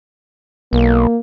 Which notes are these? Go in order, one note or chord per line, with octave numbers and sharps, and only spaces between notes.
B1 A#3